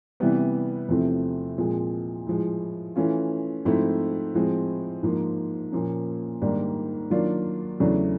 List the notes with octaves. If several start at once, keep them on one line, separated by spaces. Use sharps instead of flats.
C3 E3 G3 B3
E2 C3 F3 A3 C4
A#2 F3 G#3 C4
A2 F3 G#3
E3 A3 C#4 F4
G#2 F3 A3 C4 E4
A2 F3 G#3 C4
G#2 F3 A#3
A#2 F3 A#3 C#4
G#2 D#3 G3 A#3 D4
D#3 F#3 A#3 D4 F4
E2 C#3 F#3 A3 D4